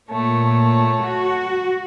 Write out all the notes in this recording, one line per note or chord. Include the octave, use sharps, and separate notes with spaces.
A#2 A3 C#5
F#4